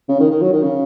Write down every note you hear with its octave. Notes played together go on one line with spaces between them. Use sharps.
C#3
D#3
D#3
F#3
D#3
C#3